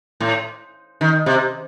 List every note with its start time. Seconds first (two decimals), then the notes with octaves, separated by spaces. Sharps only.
0.20 A2
1.01 D#3
1.26 C3